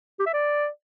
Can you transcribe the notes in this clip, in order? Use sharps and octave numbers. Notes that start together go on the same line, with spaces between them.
G4
E5
D5